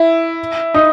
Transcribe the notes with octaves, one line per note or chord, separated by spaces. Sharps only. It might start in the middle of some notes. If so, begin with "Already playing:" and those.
Already playing: E4
D#4